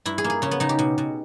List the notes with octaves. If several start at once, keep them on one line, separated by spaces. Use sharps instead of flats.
G2 E4
G#4
A#3
G#4
C#3 C#4
B3
C#3 D#4
G4
B2
B2